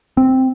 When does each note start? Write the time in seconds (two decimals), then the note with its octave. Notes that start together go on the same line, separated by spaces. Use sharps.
0.17 C4